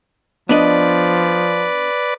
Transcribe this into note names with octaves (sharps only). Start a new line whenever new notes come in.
F3 B3 D4 B4 D5 D#5